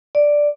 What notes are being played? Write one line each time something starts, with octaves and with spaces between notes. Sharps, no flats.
D5